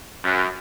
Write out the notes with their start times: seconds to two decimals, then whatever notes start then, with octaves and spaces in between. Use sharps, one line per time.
0.24 F#2